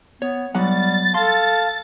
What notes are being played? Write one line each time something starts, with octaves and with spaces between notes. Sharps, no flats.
B3 C#5
F#3 G3 B3 F#5 A6
A4 F5 A5 C6